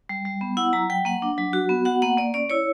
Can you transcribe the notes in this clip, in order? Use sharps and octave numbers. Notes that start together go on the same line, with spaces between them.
G3
G3
B3
E4 F#5
F#3 A#5
F#3 G5
A#3 F#5
D4
F#3
F#4
B3
F#4 F#5
A#3 F#5
A#3 D5
C#4 D5
E4 C#5